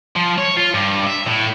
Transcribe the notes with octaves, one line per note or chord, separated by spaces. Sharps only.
F3
C#5
F4
G2
E5
A2